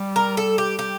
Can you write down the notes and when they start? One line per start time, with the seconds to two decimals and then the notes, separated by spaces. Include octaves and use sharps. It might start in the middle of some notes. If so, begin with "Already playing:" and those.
Already playing: G3
0.16 A#4
0.37 A4
0.58 G4
0.79 G4